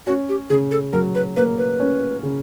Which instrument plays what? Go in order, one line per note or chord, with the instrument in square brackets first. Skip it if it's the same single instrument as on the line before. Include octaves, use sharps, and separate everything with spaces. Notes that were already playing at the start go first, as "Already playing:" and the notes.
[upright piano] C#4 [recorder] F#4
[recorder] G4
[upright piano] C#3 [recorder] G#4
[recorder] A4
[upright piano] F#3 [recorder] A#4
[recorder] B4
[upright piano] A#3 [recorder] B4
[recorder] B4
[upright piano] C#4
C#3